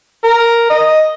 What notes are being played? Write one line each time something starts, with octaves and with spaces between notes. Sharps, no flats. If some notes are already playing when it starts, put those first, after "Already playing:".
A#4
D#5